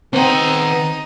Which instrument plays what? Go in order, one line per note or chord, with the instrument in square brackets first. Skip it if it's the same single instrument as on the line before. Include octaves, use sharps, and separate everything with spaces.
[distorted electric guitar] D#3 F#5 [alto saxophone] B3 [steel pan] C4 [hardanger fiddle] D#4